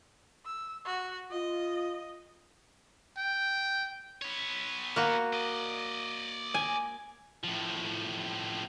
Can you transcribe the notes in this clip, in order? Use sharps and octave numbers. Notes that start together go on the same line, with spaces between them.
E6
F#4
F4 D#5
G5
B3 C#5
A#3 F#4
D5 D#5
G#5
A2 F3